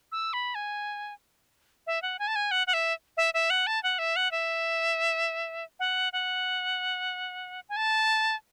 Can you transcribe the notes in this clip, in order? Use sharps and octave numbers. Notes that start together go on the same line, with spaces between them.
E6
B5
G#5
E5
F#5
G#5
A5
G#5
F#5
F#5
E5
E5
E5
F#5
A5
F#5
E5
F#5
E5
F#5
F#5
G#5
A5